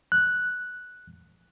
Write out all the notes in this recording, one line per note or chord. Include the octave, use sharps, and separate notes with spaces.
F#6